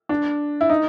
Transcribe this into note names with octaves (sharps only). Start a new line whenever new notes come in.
D4
E4
D#4